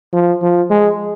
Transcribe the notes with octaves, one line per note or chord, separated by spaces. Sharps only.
F3
F3
G#3